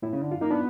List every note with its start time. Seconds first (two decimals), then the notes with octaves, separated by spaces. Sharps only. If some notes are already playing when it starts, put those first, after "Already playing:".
0.02 A2 E4
0.13 C#3
0.22 D3
0.32 F4
0.41 A#3 D#4
0.51 B3 D4